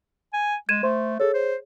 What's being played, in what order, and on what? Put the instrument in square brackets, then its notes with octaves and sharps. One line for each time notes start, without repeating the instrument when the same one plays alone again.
[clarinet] G#5
[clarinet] G#3 [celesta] G#6 D#7 E7
[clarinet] A3 [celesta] C5 C6
[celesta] G#4 C#5 [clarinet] A4
[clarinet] C5